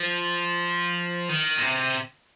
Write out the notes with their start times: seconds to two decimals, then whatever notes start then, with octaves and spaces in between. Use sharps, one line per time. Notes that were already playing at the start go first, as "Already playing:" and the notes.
Already playing: F3
1.29 D#3
1.58 A#2
1.62 C3